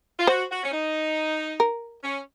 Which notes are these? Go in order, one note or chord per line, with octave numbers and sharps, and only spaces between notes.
F4
F#4 C5
F#4
C#4
D#4
A#4
C#4